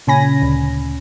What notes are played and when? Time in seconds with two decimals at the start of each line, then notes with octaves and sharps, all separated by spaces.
0.07 A#2 C#3 C#4 G#5 B5 A#6
0.42 D2